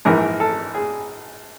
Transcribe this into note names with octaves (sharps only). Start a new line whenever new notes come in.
A#1 G#2 E3 A#4
A4
G#4